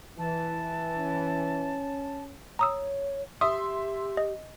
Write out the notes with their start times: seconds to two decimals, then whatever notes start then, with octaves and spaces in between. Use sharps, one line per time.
0.19 E3 A5
0.98 C#4
2.59 C#5 A#5 D#6 E6
3.41 G4 E5 C6 D#6
4.17 D#5